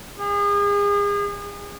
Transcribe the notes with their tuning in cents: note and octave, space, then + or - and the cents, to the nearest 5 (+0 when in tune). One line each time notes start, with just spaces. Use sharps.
G#4 -35